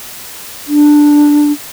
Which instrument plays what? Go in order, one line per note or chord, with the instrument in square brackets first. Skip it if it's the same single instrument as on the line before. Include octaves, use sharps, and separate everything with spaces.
[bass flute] D4